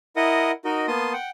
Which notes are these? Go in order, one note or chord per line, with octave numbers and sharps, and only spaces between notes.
E4 A#4 D#5 F#5 D#6
D#4 F#4 A#4 D#5
A#3 B3 A5 C6 D#6
F#5 G5